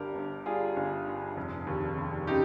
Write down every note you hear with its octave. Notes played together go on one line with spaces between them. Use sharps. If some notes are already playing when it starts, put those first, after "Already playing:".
Already playing: G1 G2 G4 A#4
G1
G3 F4 G#4
G1
G2
F1
D#2
F1
C#3 D#4 G4